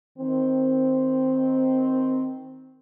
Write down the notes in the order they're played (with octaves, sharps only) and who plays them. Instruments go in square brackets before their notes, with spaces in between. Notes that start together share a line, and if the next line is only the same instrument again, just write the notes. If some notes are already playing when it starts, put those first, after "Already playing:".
[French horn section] D#3 C4